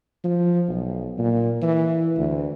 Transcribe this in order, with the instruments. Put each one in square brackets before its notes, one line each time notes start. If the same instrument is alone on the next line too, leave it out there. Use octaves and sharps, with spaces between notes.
[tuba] F3
B1
A#2
E3
D2